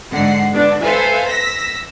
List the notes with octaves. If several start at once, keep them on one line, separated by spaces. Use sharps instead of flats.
G#2 D3 F#5 C7
D3 B3 D4
A4 B4 C5 E5 F5 G#5
E6 A#6 B6